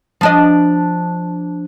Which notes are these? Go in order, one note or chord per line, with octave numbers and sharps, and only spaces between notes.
F3 D4 D#5